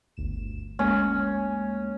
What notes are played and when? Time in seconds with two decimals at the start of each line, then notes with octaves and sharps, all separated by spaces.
0.17 G1 D2 E7
0.79 D2 G#3 A#3 C#4